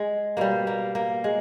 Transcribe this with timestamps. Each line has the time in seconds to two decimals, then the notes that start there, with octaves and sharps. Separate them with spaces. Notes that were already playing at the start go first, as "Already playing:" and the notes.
Already playing: G#3
0.37 B2 G3 A#3
0.67 A#3
0.95 A#3
1.24 G#3